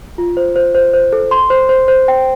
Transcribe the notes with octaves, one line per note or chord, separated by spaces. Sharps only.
F4
C5
C5
C5
C5
A4
C6
C5
C5
C5
G5